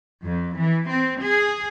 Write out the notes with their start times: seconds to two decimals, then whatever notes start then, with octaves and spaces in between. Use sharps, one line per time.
0.24 F2
0.58 E3
0.89 C4
1.22 G#4